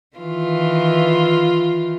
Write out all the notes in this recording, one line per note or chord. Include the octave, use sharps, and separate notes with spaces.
D#3 E3 F4